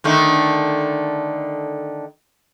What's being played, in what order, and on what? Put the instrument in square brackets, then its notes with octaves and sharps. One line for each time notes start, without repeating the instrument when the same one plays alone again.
[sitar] D3 D#3 A3